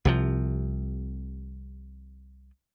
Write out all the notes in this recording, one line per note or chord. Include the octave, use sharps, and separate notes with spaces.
C2 C3 F3